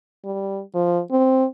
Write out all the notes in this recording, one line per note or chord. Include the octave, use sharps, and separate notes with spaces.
G3
F3
C4